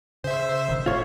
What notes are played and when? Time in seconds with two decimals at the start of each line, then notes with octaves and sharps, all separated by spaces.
0.24 C#3 C5 E5
0.68 G1 B2 D#3
0.86 A2 F4 C#5